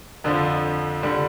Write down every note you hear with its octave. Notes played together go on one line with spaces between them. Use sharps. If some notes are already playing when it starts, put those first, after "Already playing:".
F2 D3 F3
D3 G3